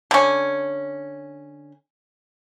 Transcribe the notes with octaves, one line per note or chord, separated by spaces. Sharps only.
D3 C#4